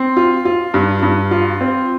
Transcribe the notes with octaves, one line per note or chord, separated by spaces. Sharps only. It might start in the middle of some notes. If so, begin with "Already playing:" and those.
Already playing: C4
F4
F4
G2
G2
F4
C4